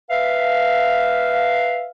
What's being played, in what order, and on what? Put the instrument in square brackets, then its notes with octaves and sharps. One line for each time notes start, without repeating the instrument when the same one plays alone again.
[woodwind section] B4 E5 F5